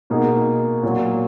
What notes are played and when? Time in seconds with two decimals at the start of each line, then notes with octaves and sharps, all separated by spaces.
0.10 B2 A#3 D#4 G#4
0.83 A#2 F#3 A#3